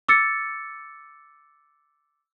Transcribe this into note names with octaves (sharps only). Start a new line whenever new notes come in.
D6 E6 A6 C#7